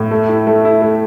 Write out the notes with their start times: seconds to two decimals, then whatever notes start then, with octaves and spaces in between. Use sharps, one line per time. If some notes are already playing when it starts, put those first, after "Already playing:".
Already playing: A2
0.11 A3
0.29 E4
0.47 A3
0.65 E4
0.82 A3